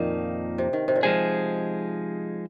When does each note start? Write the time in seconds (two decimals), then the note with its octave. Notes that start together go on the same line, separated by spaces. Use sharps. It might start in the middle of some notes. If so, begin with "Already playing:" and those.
Already playing: F2 A#2 D#3 F3 A#3 D#4
0.58 C3
0.73 D#3
0.88 C3
0.96 A#2
1.03 C3 F3 G#3 D#4 G#4